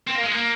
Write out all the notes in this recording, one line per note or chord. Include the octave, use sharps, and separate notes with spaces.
C4
A#3
G#3
A#3